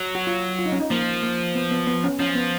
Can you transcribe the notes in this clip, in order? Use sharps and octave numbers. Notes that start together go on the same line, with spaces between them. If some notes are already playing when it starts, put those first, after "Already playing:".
Already playing: F#3
F#4
F4
F4
D#4
C#4
D#4
F3 A#3
A#3
B3
B3
B3
C#4
F3 C#4
B3